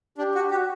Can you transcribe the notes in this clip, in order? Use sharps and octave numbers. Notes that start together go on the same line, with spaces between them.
D4 G4
F#4
F#4 G4